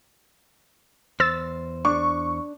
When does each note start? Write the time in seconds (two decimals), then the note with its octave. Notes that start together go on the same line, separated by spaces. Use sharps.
1.20 E2 C5 E6 A6
1.85 D4 C#6